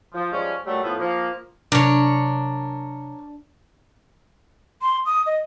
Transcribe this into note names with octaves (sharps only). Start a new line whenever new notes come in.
F3
F3 G3 G#3 C#4
A#2 F#3 G3 A3
A2 F3 B3
F3 A#3
C3 F#3 D4 A#4 C#5
C6
D#6
D#5